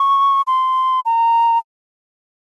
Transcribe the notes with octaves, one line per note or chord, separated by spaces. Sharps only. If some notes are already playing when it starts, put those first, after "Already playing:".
Already playing: C#6
C6
A#5